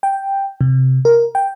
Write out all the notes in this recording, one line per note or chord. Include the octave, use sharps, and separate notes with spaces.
G5
C3
A#4
G5